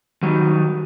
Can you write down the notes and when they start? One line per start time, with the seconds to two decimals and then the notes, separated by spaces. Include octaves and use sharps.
0.23 D#3 F#3 G3 D#4